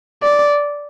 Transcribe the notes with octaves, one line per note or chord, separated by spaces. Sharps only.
D5